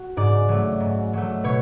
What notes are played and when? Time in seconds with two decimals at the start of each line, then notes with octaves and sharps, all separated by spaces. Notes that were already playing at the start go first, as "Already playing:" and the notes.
Already playing: F#4
0.17 G#2 D5
0.48 F#3 A3
0.80 G#2
1.13 F#3 A3
1.44 B2 C#5